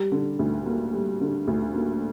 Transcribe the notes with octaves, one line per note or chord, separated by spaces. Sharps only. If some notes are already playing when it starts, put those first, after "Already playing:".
Already playing: G3
D3
D2
A#3
G3
D3
D2
A#3